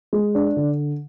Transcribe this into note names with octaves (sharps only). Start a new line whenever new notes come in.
G#3
D4
D3